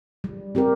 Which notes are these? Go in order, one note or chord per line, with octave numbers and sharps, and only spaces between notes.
G3
C4 G4 A#4